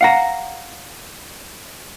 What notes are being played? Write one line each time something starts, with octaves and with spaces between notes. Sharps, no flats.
F5 F#5 A#5